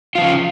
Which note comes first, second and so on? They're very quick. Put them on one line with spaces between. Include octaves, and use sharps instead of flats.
F4 F3 C#3